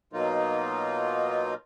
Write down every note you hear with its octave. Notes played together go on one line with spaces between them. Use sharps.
B2 F#3 A#3 D#4 F4